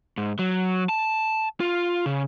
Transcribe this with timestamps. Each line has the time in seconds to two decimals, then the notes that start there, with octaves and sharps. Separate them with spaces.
0.18 G#2
0.39 F#3
0.89 A5
1.60 F4
2.06 C#3